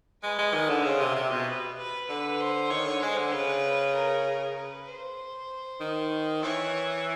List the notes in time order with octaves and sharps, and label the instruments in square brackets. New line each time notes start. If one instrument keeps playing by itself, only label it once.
[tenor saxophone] G#3 [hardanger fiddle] B4
[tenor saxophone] G#3
D#3
D3
[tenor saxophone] C#3 [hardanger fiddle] C5
[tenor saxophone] C3
C3
B2
[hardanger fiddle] B4
B4
[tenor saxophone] D3 [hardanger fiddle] B4
[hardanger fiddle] C5
[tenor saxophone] D#3 [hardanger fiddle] C#5
[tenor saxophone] D3
[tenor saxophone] G#3 [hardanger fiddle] C5
[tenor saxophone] D3
[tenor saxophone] C#3 [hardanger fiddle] B4
[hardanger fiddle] A#4
B4
C5
[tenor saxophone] D#3
[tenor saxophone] E3 [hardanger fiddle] C#5